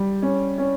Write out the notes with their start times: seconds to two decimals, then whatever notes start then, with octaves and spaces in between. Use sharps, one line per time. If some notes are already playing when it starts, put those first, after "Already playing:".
Already playing: G3
0.22 C#4
0.58 C#4